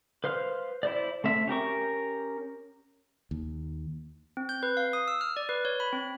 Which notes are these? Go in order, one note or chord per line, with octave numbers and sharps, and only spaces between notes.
B4 C5 F5 F6
E4 C5 D5
A3 C4 E5
C#4 G4 A#4 C#6
D#2
C4
G6
B4
F5
D#6
E6
F6
D5
B4
C#5
B5
C4